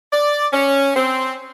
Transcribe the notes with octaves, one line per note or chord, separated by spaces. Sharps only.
D5
C#4
C4